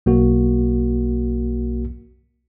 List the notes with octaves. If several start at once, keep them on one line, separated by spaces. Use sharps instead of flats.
B1 A#3 F#4